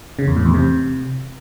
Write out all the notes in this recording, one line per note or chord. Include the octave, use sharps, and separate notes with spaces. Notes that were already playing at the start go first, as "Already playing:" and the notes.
C#3
E2
A2
E2
C3